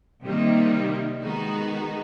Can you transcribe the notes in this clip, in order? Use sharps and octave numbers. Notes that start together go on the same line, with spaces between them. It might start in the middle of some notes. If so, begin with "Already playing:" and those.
C3 D#3 G3 A#3
D#3 G#3 B3 D#4 F#4